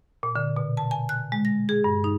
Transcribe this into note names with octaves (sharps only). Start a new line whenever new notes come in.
A#2
D3
B2
A5
G#5
F#6
G#3
A#6
G#4
G2
D#4